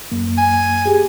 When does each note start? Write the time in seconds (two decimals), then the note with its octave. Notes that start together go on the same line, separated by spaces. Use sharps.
0.12 F#2 A#3
0.38 G#5
0.86 G4 G#4